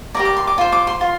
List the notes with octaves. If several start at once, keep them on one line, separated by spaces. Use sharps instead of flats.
G4 A#4 D5 A#5
D6
C6
D6
F4 C5 C6
D6
C6
F4 C6